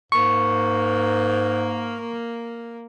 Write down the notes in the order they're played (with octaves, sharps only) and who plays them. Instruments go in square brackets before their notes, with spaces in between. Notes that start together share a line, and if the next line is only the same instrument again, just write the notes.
[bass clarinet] G#2 [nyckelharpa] A#3 A#4 [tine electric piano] C#6